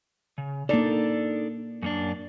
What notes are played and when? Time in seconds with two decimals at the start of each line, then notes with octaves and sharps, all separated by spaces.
0.38 C#3
0.69 A#3 D4 D#4 A4 D5
1.82 F#2 A#3 D4